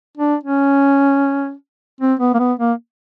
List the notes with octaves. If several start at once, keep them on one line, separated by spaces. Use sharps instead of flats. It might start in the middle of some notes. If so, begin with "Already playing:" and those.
D4
C#4
C4
B3
A#3
B3
A#3